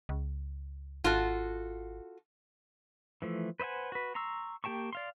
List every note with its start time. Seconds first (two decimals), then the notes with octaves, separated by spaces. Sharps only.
0.09 C#2
1.04 G#1 F4 F#4 A4
3.22 E3 F3 A3
3.60 B4 C5 D#5 F#5 G#5
3.92 F#4 B4
4.15 A#5 C6 C#6 E6
4.64 A#3 G4 G5 A5 C#6
4.93 D5 F5 C6